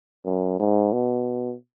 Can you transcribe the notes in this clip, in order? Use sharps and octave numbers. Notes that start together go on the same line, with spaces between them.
F#2
G#2
B2